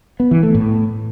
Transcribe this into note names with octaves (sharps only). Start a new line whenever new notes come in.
B3
E3
A3
A2